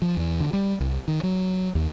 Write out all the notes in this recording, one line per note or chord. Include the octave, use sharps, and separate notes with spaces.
F3
E2
D3
G3
C2
D#3
F#3
D#2